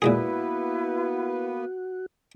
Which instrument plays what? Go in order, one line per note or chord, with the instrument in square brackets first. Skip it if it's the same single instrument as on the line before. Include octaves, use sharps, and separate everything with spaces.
[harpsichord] A#2 G#3 G#4 [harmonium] A#3 B3 B4 [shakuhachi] E4 [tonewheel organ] F#4